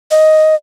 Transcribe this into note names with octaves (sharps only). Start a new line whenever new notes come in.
D#5